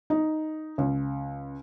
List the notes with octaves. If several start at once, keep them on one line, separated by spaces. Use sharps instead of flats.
D#4
C#2